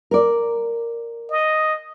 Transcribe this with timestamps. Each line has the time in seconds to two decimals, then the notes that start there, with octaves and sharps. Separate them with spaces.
0.11 A#4 D5
1.31 D#5